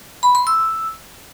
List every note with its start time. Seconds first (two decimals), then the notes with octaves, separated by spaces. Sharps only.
0.23 B5
0.35 C6
0.47 E6